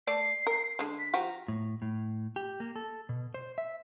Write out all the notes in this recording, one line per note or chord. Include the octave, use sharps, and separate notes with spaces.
A3 A4 D5 C7
A#4
D3 G#3
B6
F3 F#4 G4 A#5
A2
A2
G4
A#3
A4
B2
C5
E5